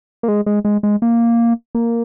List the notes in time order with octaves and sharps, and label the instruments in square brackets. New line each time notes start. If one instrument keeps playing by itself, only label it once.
[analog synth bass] A#3
G#3
G#3
G#3
G#3
A#3
A#3